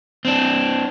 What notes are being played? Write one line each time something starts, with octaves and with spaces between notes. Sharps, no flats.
C4 D4